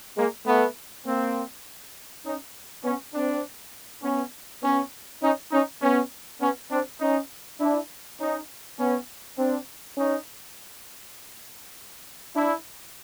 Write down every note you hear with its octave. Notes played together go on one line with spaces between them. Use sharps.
G#3 A#3
A3 B3
A#3 C4
C#4 D#4
B3 C#4
C4 D4
B3 C#4
B3 C#4
C#4 D#4
C#4 D#4
B3 C#4
B3 C#4
C4 D4
C#4 D#4
D4 E4
C#4 D#4
B3 C#4
C4 D4
C#4 D#4
D4 E4